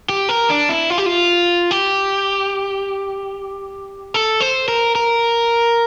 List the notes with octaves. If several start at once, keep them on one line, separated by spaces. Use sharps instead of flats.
G4
A#4
D4
E4
F4
G4
F4
G4
A4
C5
A#4
A#4